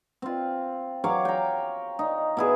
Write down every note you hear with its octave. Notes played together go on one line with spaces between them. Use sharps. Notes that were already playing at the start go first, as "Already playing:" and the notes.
C4 F4
F#3 C#5 F5 D6
G5 A#5
D#4
B2 E4 G#4